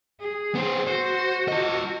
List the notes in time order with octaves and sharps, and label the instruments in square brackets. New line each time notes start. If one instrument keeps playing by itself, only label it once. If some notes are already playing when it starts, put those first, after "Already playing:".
[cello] G#4
[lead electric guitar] B3 C5
[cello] F#4 [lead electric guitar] C5
[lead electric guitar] F4 D#5